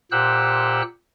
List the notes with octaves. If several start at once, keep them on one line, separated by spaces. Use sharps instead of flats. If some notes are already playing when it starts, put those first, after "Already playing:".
A#2 G4 C5 F#5 E6 F#6